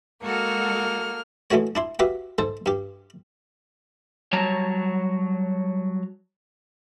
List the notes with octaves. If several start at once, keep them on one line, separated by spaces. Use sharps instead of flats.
G#3 A#3 F#4 A4 F6
E3 G#3 A3 F#4 C#5
D4 E4 C6
F#4 G4 B4 E5 F5
G#2 A4 C5
G2 G4
F#3 G3 C#5 A5 A#5